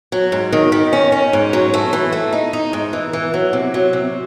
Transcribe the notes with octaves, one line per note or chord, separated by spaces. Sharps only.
F#3
G#2
D#3
D#3
C#4
C#4
G#2
F#3
A3
E3
A3
D#4
D#4
G#2
E3
E3
F#3
C3
F#3
C3